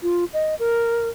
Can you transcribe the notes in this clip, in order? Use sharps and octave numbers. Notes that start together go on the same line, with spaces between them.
F4
D#5
A#4